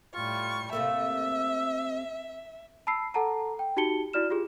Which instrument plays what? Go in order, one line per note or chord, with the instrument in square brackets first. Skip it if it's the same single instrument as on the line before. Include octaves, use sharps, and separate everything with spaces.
[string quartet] A2 G3 C#6 [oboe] F4
[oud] C3 A3 A#3 [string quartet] E5 [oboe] E6
[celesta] A5 B5 E6 C7
A4 F#5 A5 A#5
G5
D#4 F#4 G4 A5 C#7 G7
E4 F#4 D5 F6 E7
F4 G4 G#4